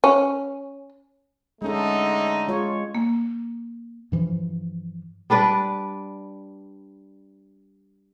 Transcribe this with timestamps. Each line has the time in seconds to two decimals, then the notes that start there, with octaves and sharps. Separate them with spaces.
0.04 C#4
1.62 D3 G#3 A3 C#4 D#4 A4
2.48 G#3 F4 C#5
2.95 A#3
4.12 G2 E3 F3
5.30 G3 D4 B4 D5